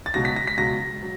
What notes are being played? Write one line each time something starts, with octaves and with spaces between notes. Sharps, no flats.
A6
C#2 B2 F#3 A#6
B6
A#6
B6
C#2 B2 F#3 A#6
F#3